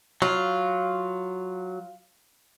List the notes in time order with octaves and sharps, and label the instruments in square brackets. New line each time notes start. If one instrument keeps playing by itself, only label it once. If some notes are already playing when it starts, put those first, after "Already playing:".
[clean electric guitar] F#3 [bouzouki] F4